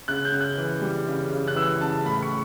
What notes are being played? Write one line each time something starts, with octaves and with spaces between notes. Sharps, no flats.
C#3 F#6
G6
C#3
F#6
E3
G3
C#3
C#3
F#6
E3 E6
C#3 A5
A2 B5
B5
C#6